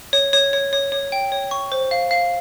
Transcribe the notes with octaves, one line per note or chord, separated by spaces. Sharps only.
C#5
C#5
C#5
C#5
C#5
G5
C#5
C#6
C5
F5
F5